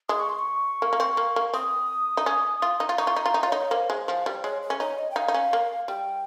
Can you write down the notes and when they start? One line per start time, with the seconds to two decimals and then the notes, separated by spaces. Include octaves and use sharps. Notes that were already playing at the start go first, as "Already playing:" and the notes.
0.09 G#3 D#6
0.20 C#6
0.29 C6
0.39 C#6
0.82 A#3
0.93 A#3
1.00 C4
1.17 A#3
1.36 A#3
1.54 C4 D#6
2.17 D#4
2.26 C#4
2.62 F4
2.80 D#4
2.89 F4
2.98 D#4 C#6
3.07 F4
3.16 D#4
3.22 F4 A#5
3.34 D#4
3.41 F4 D#5
3.48 D#4 C#5
3.71 A#3 C5
3.90 G#3
4.08 F3
4.26 G3
4.44 G#3 C#5
4.62 C#5
4.70 C#4
4.80 D#4 C#5
4.99 D#5
5.11 G5
5.16 D#4 F5
5.28 D#4
5.34 C#4
5.53 A#3
5.88 G3 G5